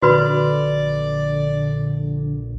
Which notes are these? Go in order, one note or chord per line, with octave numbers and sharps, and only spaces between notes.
A#1 D3 F#4 B4 D5 B5